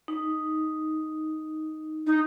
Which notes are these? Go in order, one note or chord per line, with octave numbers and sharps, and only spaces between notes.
D#4
D#4